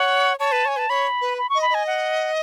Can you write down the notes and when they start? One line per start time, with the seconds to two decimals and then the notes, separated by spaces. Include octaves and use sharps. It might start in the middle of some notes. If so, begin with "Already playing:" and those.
Already playing: C#5 F#5
0.39 C#5 A5
0.52 B4
0.65 C#5 G#5
0.77 B4 A5
0.89 C#5 B5
1.21 B4
1.38 B5
1.50 C#6
1.55 D#5
1.62 B5
1.70 D#5 G#5
1.87 F#5